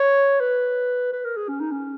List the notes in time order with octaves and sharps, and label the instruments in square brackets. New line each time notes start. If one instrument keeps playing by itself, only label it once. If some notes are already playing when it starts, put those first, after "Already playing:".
Already playing: [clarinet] C#5
B4
B4
A#4
G#4
C#4
D#4
C#4